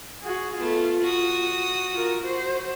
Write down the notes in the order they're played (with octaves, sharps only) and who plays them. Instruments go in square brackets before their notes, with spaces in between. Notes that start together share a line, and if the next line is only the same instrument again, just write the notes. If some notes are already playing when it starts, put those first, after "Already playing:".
[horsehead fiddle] F#4 G#4
[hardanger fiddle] A3 B3 [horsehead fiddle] F4
[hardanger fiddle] F#4 D#6
[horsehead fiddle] F4 A#4
F#4 C5